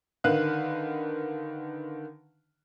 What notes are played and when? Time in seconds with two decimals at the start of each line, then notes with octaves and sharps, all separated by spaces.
0.24 D3 D#3 B4 F5 F#6